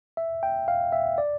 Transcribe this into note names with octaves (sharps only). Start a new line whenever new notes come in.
E5
G5
F5
E5
D5